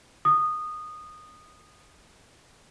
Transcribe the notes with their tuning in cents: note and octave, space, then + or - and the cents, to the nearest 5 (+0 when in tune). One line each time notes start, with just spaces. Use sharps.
D#6 -15